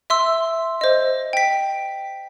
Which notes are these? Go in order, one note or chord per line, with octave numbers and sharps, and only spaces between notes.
E5 C6 E6
C5 D#5
G5 B6